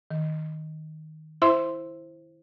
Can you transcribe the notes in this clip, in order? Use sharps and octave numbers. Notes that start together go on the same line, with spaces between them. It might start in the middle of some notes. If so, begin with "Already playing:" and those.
D#3
E4 C5 E5 C6 E6